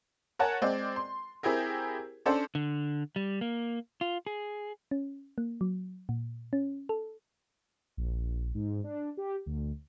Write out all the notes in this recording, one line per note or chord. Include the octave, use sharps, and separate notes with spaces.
A#4 C#5 F#5 G#5 A5
G#3 C4 D5
C6
C4 E4 G4 G#4 A#4
C#4 D4 A4 C5 D5
D3
G3
A#3
F4
G#4
C#4
A#3
F#3
A#2
C#4
A4
A#1
G#2
D4
G4
D2